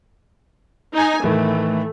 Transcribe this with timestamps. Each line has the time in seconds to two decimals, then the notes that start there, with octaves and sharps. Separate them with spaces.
0.94 D#4 G#5
1.24 A2 D#3 E3 A3